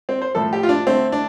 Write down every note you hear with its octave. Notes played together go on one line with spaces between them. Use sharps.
C4
C5
A2 F3 A3 A4
G4
F4
D4
D3 A3 C4
D4